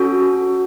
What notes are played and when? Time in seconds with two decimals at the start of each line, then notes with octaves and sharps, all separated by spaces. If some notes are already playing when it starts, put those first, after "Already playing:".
Already playing: C#4 F#4 A4